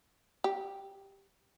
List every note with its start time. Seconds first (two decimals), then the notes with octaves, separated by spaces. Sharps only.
0.44 G4